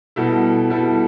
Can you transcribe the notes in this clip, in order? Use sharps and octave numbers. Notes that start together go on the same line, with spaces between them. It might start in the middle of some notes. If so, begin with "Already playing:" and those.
B2 G3 B3 E4 A4
B2 G3 B3 E4 A4